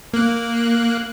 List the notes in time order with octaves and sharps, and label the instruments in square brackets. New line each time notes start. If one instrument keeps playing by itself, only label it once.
[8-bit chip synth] A#3 F#6